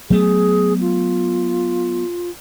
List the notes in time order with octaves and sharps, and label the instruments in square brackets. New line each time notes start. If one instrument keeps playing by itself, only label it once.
[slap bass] F#3 A3 B3 [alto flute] G#4
[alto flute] F4